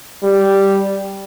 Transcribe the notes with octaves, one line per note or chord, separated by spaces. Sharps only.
G3